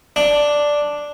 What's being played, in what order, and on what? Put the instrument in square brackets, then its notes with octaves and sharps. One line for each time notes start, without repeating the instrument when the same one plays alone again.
[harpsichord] D4